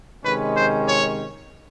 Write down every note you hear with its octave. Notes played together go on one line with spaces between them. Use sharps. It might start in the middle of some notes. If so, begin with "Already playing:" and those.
C3 D#3 G#3 C#4 B4
C5
C#5